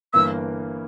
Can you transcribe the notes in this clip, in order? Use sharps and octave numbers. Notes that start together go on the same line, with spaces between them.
G1 G2 E3 A#3 E6